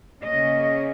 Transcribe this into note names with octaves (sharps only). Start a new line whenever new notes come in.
C#3 A#3 C#4 D#5